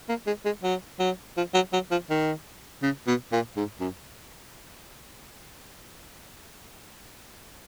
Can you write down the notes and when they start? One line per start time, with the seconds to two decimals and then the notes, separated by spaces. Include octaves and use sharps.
0.09 A#3
0.27 G#3
0.45 G#3
0.63 F#3
0.99 F#3
1.37 F3
1.54 F#3
1.73 F#3
1.91 F3
2.10 D#3
2.82 C#3
3.07 B2
3.32 A#2
3.56 G#2
3.80 F#2